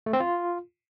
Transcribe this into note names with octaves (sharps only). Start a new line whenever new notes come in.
A3
C4
F4